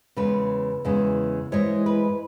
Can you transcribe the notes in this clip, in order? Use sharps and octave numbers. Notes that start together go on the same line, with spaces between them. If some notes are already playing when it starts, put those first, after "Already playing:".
E2 C#3 G#3 B4
E2 C#3 G#3
G#2 E3 G#3 C#5
B4